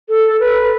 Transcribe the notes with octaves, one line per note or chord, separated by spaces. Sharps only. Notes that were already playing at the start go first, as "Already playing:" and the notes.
A4
B4